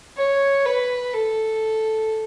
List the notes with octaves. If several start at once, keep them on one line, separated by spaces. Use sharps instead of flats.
C#5
B4
A4